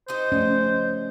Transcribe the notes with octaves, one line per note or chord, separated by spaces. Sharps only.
D#4 G4 C5 D#5
F3 A3 C#4 D5